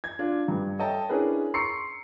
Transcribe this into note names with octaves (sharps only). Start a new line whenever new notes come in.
G#6
D4 F4
G2
A4 C#5 D#5 E5 G5 A5
C#4 D4 E4 G#4 A#4 B4
A#5 C6 C#6 E6 C7 C#7